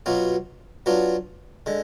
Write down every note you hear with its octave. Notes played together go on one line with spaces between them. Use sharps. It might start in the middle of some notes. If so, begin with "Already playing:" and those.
B2 F#3 B3 F4
F#3 B3 D4 F4
D3 G#3